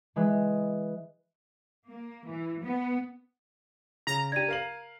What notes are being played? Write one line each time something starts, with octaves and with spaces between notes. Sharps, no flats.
E3 G#3 B4
A#3
E3
B3
C#3 A#5
D4 G4 G#6 D#7
A#4 F5 F#7